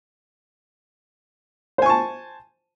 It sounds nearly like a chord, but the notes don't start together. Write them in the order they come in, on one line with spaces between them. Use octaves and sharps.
C5 G#5 C#6 A5